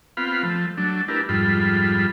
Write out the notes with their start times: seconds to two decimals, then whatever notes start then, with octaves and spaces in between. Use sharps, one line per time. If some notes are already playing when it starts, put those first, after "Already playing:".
0.17 B3 C4 F4 F5 B5
0.43 F3 A3
0.77 F#3 A3 D4
1.08 A3 D4 E4 G4 A#4 B4
1.29 F2 G#2 G3 F4 A4 B5